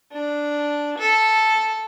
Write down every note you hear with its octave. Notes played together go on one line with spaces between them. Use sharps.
D4
A4